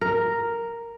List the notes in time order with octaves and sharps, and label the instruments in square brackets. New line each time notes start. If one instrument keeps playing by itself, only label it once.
[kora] A#4